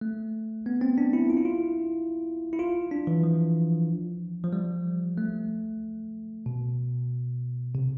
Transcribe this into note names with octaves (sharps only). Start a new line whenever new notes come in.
A3
B3
C4
D4
E4
F4
E4
F4
E4
F4
D4
E3
F3
F3
G3
A3
B2
C3